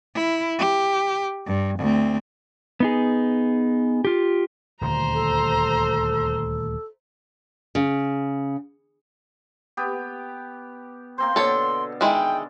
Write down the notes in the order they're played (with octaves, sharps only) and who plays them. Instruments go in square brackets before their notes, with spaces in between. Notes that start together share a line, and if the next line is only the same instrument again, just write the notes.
[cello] E4
G4
G2
D2 C4
[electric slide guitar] B3 D#4 G#4
F4 G4
[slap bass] D#1 D2 [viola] C5 A#5
[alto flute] A4
[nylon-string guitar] C#3
[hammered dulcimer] B3 G4
[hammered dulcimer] A#3 C4 C5 [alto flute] C6
[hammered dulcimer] B2 D3 [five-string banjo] A4 C#5
[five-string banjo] D#3 G#3 E4 [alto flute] G5